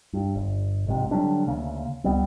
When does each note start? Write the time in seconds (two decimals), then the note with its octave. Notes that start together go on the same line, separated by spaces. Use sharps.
0.13 G2
0.36 G1
0.87 A#1 G#2 C3
1.11 D3 F#3 G3 D4
1.47 D2 C#3 A#3
2.04 C#2 G3 B3 C4